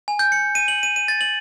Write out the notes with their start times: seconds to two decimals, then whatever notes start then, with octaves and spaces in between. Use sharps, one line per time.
0.08 G#5
0.19 G6
0.32 C#7
0.55 D#7
0.68 F#7
0.83 D#7
0.96 D#7
1.08 A6
1.21 F#7